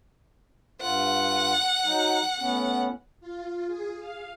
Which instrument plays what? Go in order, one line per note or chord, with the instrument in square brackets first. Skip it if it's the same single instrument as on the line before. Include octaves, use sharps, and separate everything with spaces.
[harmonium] G2 F4 [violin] F#5
[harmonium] F#3 D#4
A2 B3 C#4
[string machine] F4
G#4
F5